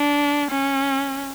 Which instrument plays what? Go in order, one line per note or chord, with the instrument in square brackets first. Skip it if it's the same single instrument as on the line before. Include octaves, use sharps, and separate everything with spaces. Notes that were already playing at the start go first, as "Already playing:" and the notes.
Already playing: [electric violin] D4
C#4